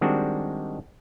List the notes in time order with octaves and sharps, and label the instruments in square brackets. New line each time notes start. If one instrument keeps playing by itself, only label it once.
[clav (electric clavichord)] D#3 G3 G#3 C4 D4 F#4